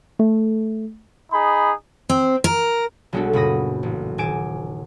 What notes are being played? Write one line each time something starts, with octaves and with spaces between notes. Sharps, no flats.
A3
D#4 G#4 B5
C4
A#4
B1 G3 G#3 D4 F#4 A4
F#1 A#2 F#3 B5 D#6 A#6
A1
D#1 G#5 D6 D7 E7